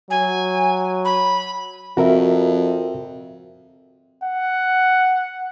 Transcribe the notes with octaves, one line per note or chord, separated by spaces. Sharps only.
F#3 G#5
B5
F2 F#4 A#4 E5
F#5